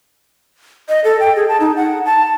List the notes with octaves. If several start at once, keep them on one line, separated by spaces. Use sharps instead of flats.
D#5
A4
G5
G#4
A5
D#4
F#5
A5